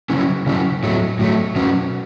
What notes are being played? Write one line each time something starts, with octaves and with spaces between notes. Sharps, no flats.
C#3 F#3 C#4 E4
C#3 F#3 C#4 E4
A2 F#3 A3
A2 F#3 A3
B2 F#3 C#4 F#4